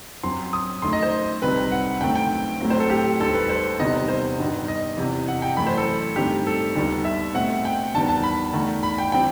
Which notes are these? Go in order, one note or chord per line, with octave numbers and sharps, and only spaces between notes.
F#2 F#3 C4 C6
D#6
F#2 D#3 A3 C6
D#5
C5
C2 C3 D#3 G3 C4 B4
F#5
F#2 D#3 A3 C4 G5
G5
A2 F#3 A3 C4
C5
A4
G4
D#2 D#3 G3 A4
B4
C5
E2 C3 D#3 G3 B3 D#5
C5
G2 D#3 G3 B3
D#5
E2 C3 E3
F#5
G5
F#2 E3 A3 B5
C5
A4
G2 D#3 A3 C4 G4
A4
D#2 D#3 G3 B3
E5
B2 A3 C4 F#5
G5
E2 D#3 G3 B3 A5
A5
B5
E2 D#3 A3
B5
G5
E3 G3 C4 G5